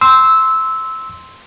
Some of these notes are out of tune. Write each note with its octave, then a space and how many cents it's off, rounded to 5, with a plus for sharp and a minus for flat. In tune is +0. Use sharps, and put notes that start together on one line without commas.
C6 +0 E6 -15